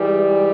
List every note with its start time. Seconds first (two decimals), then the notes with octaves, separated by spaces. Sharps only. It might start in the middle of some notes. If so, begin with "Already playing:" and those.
Already playing: G#2 E3 G3